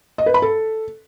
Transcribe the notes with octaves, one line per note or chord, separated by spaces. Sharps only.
D#5
B4
B5
A4